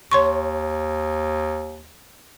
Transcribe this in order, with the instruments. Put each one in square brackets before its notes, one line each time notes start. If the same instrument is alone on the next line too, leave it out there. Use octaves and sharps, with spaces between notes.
[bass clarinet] D#2 [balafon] C#5 C6 C#6